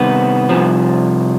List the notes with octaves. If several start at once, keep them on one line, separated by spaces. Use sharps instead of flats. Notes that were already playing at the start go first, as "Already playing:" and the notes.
Already playing: C2 C3 D#3 B3
C2 C3 F3